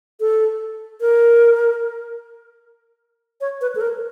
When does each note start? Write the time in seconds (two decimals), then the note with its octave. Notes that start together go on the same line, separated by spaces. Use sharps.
0.20 A4
1.01 A#4
3.41 C#5
3.61 B4
3.75 A4
3.81 A#4